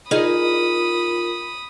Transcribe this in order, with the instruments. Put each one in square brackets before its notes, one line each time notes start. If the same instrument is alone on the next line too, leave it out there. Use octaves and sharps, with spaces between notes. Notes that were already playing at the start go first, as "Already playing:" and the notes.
[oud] D#4 G#4 [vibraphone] F4 A#4 [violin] B5 D#6